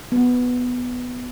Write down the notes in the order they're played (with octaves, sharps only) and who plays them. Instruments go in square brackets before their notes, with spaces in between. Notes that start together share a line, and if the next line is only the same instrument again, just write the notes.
[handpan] B3